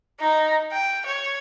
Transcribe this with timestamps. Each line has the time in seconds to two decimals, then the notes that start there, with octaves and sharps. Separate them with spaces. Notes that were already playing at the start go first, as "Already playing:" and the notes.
0.20 D#4
0.72 G5
1.06 C#5